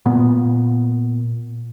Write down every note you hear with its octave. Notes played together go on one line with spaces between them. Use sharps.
A#2 B3